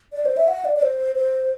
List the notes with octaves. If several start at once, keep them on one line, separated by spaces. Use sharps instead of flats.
D5
C5
E5
F#5
D5
D5
C5
C5